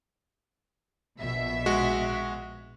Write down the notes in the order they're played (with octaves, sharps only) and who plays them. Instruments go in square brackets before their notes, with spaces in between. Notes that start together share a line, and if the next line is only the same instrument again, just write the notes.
[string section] A#1 B2 E5
[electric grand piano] G#3 F#4